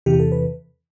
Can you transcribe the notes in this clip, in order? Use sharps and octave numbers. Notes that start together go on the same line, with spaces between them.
E2 C3 E3 G4
A4
B4